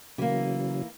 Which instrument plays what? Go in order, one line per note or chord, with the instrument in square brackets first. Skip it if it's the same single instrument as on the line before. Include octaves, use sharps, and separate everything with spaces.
[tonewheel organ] C#3 F#3 [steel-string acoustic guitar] E3 A#3